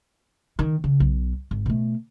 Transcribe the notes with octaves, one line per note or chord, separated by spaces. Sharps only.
D#3
C#3
B1
G#1
B2 A3